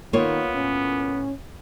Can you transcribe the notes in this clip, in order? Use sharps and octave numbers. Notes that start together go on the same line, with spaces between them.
D#3 A#3 B3 F4 C#5
A2 C#4